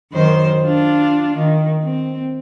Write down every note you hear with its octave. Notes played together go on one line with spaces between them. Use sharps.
F#2 D#3 C5
D4 F4
D#3
C4